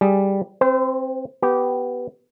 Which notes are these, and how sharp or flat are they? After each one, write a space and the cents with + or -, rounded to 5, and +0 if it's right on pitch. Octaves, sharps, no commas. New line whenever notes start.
G3 +0 G#4 +0
C4 +15 C5 -30
B3 +0 G4 -15